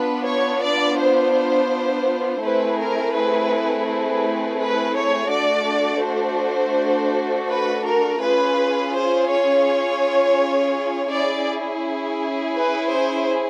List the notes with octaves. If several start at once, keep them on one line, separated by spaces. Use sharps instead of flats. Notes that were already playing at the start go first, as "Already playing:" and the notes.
Already playing: B3 D4 F4 B4
C#5
D5
C5
A3 C4 E4 G#4 B4
A#4
B4
B4
B4
C#5
A3 D4 F#4 A4 D5
C5
B4
A#4
C#4 F4 G#4 B4
C5
C#5
C#4 E4 G#4 D5
B4
C5